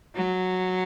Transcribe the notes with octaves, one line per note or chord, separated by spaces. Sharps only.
F#3